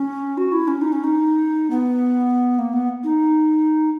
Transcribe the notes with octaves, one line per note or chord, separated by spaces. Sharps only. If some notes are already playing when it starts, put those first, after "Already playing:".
Already playing: C#4
F#4
E4
C#4
D#4
C#4
D#4
B3
A#3
B3
D#4